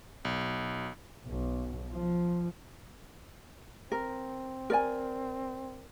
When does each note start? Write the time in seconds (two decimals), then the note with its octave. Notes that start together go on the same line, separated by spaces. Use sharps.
0.25 B1
1.27 B1
1.92 F3
3.92 C4 A#4
4.70 A#4 D5 G#5